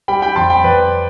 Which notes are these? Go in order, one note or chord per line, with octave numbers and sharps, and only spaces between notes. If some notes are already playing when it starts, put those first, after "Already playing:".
G3 G5 B5
G5 B5
F2 A5 C6
G5 B5
F2 B4 D5